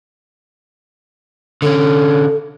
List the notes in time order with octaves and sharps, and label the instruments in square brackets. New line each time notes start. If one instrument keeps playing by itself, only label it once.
[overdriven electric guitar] D3 C#4 [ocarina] A4